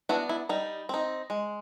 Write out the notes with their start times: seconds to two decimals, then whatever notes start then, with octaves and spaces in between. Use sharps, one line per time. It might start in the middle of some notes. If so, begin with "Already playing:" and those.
0.09 B3 D4 E4 F#4
0.29 E4
0.49 G3 D#4
0.89 C4 D#4
1.30 G#3